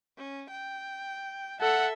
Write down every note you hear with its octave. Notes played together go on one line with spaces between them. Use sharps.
C#4
G5
A4 E5 F#5